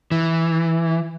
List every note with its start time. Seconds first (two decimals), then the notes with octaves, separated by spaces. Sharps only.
0.12 E3